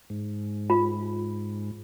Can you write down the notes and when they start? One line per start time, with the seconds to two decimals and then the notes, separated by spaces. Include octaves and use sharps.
0.10 G#2
0.70 F4